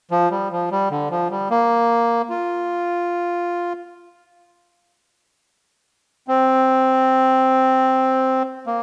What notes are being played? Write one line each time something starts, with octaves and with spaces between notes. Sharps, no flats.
F3
G3
F3
G3
D3
F3
G3
A#3
F4
C4
A#3